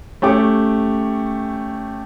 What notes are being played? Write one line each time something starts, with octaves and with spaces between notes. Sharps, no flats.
A3 C#4 G4 D6